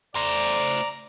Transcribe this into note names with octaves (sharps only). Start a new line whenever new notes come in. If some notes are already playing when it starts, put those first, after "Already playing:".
A3 C5 D5 A#5